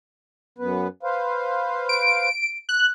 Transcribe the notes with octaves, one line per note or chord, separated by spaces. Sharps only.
F#2 B3 B4
B4 C5 F5
D7
F#6